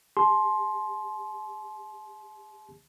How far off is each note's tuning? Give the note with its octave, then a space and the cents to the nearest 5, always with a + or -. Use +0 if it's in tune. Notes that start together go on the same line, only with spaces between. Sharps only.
G4 +45 A5 -45 C6 +5